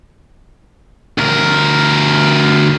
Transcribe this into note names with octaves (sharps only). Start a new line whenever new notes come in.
D2 A#4